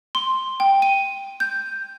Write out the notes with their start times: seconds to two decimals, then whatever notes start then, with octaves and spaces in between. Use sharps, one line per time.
0.15 C6
0.60 G5
0.82 D#7
1.40 G6